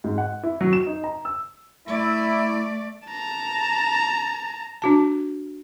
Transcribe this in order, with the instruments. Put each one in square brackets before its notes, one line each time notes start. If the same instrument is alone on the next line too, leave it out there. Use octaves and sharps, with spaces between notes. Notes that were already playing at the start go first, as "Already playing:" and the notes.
[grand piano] G#2
F#5
E4
F#3
E7
D#4
A#5
E6
[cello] A3 D5 [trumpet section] E4
[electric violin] A5 A#5
[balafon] D4 F#4 A5